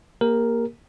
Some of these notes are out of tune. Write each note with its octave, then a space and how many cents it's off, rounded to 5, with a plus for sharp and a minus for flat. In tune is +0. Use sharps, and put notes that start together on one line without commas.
A#3 +0 G4 +35 A#4 +0